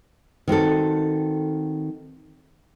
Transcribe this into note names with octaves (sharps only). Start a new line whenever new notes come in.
D#3 C4 F#4 A4